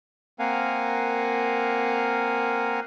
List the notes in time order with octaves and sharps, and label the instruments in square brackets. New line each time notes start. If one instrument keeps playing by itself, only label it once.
[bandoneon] A#3 C4 A#4 F5 F#5 G#5